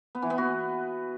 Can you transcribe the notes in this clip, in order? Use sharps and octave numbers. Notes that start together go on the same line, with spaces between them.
B3
E3
B3
F#4